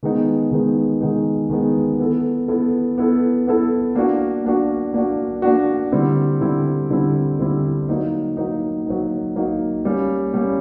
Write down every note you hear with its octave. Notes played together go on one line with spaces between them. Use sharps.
D#3 G#3 B3 D#4
D#3 G#3 B3 D#4
D#3 G#3 B3 D#4
D#3 G#3 B3 D#4
B3 E4 A4
B3 E4 A4
B3 E4 A4
B3 E4 A4
A#3 D4 F#4
A#3 D4 F#4
A#3 D4 F#4
A#3 D4 F#4
D3 G3 C4 E4
D3 G3 C4 E4
D3 G3 C4 E4
D3 G3 C4 E4
F#3 A#3 D#4
F#3 A#3 D#4
F#3 A#3 D#4
F#3 A#3 D#4
G3 A#3 C#4
G3 A#3 C#4